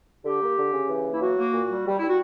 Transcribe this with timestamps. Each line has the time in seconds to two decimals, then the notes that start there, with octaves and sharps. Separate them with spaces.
0.24 D3 G4
0.41 A#3
0.57 D3
0.73 C#3
0.89 E3
1.05 A#3
1.12 E4
1.21 F#3 F#4
1.38 A#3
1.53 A#2
1.69 G3
1.86 G3
1.98 G3 E4
2.08 F#4